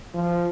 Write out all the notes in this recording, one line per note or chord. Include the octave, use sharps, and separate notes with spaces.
F3